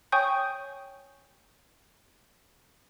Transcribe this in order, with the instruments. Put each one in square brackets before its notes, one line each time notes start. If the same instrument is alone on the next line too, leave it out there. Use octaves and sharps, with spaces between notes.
[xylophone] C#5 G5 G#5 C#6 D#6 G6